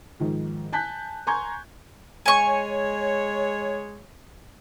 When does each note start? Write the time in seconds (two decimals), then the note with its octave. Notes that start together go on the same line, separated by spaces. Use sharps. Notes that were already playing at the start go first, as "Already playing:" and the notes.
0.20 G#2 D#3 F3
0.73 G#5 A5 F#6 G6 B6
1.27 G#5 A#5 C6 C#6 G6 G#6
2.26 G#3 C#5 G#5 C#6